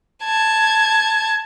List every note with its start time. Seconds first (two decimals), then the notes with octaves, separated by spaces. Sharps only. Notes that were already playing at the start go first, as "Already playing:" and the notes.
0.24 A5 G#6